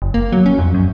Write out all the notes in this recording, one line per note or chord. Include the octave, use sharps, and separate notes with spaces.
F#1
A#3
F#3
C#4
F2
F#2